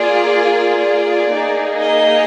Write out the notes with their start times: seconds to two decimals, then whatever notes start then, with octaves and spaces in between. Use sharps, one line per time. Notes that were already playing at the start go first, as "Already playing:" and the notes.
Already playing: A#3 F4 G#4 D5
0.80 D5
1.30 A#3 D#4 G#4
1.79 D#5